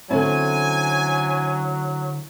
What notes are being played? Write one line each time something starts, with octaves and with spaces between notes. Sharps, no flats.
D3 F#3 C4 C#4 E4 A4 G#5